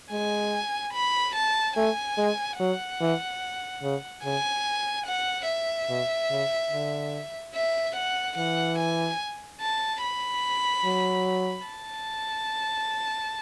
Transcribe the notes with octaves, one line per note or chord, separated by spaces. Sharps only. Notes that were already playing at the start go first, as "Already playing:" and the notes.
G#3 G#5
B5
A5
A3 G#5
G#3
F#3 F#5
E3
C#3
C#3 G#5
F#5
E5
B2
C#3
D3
E5
F#5
E3 F#5
G#5
A5
B5
F#3
A5